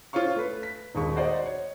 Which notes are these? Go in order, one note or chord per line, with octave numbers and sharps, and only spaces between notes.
F4 C5 C#5 F5 C#6
A3 B4
B6
D#1 D#2 G#3 C#6
F#4 C5 D5 D#5
C#5